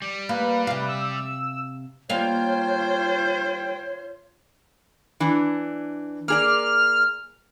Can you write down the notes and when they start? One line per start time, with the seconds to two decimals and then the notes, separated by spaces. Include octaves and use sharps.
0.02 G3
0.29 A#3 B4
0.67 C3 F5
0.89 E6
2.10 G3 A#3 F4 C5 C#5 F5 G5
5.20 E3 D4
6.28 A#3 G#4 D5 F6